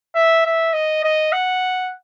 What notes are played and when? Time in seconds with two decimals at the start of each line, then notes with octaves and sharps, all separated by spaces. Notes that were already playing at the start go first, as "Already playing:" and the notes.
0.15 E5
0.45 E5
0.73 D#5
1.04 D#5
1.32 F#5